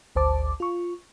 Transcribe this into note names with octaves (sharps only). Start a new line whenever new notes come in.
G#1 D2 C5 A5 D6
F4 C#6